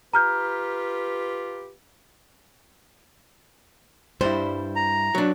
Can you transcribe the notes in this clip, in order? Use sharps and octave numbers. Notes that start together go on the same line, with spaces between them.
F4 G4 B4 A#5 F6 G6
G2 G3 E4 C5
A#5
F#3 D4